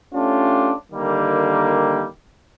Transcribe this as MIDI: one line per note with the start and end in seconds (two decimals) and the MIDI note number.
0.14 0.74 57
0.14 0.74 61
0.14 0.74 62
0.14 0.74 65
0.14 0.74 67
0.92 2.06 50
0.92 2.06 51
0.92 2.06 55
0.92 2.06 58